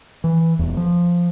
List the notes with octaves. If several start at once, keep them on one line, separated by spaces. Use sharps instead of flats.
E3
D#1 E2
F3